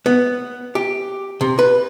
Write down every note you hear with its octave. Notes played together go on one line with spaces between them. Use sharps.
B3
G4
C3
B4